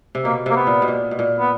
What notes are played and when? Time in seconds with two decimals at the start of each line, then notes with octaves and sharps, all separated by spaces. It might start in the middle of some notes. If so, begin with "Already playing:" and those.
0.15 C3
0.25 B2 A#3
0.46 C3 A#3
0.56 B3
0.67 A#2
0.82 B2
0.88 A#2
1.11 B2
1.19 A#2
1.40 B3